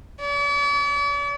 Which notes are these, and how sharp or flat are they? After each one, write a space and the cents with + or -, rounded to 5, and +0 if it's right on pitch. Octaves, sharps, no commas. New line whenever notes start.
D5 -45